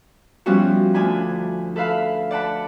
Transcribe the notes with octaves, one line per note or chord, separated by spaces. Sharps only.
F3 G3 B3 C#4 E4 F#4
D2 D4 G#5 B5
A4 B4 E5 F5 B5
D5 F#5 A5 B5